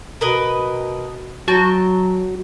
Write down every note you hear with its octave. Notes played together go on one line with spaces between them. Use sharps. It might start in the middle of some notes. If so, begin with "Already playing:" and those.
B2 A#4 B4 D#5
F#3 F#4 G5 A5